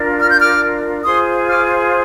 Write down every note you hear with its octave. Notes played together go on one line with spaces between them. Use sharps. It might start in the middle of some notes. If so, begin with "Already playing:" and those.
Already playing: D4 F4 A#4
F6
G6
D6 F6
F4 G#4 C5 C6 D#6
D6 F6